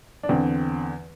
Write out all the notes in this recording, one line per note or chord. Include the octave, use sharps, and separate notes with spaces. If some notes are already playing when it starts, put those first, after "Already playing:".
D4
E2 D3 C4